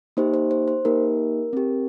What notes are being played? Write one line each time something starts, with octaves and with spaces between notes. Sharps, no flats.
A#3 D#4 G4 C5
C5
C5
C5
A#3 D#4 G4 A#4
C4 G4